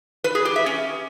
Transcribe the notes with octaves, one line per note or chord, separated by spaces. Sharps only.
B4
G#4
G4
E5
C#4